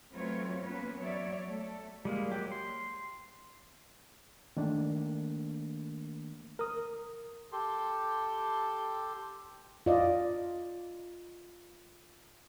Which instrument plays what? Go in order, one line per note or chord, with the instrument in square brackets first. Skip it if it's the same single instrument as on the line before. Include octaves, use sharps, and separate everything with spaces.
[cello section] F#3 A3 C4 F4 B4 C#5
A#3 B3 C#4 B4
F#3 C#5 D5 E5
A3 A4
[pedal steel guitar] G3 G#3 A#3
F#3 G4
C6
[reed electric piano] D#3 A3 A#3 D4
[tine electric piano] A#4 D#6
[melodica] G4 A4 C6
[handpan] F4 D5 D#5